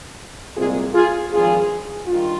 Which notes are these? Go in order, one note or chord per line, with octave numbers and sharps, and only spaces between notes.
C2 A#2 G#3 C4 F4 G#4
F4 G#4
G#1 G2 F3 F4 G#4
G2 D#3 F4